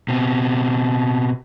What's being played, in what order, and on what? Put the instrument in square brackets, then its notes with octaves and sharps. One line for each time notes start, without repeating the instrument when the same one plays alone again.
[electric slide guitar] B2 C4